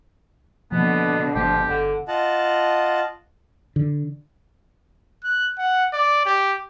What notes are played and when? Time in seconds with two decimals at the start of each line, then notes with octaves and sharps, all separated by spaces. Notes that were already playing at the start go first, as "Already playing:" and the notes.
0.72 B2 D3 F3 A#3 B3
1.36 G1 F3 A3 G4
1.69 G1 D3
2.08 F4 D#5 F#5 A5
3.76 D3
5.24 F#6
5.58 F#5
5.93 D5
6.25 G4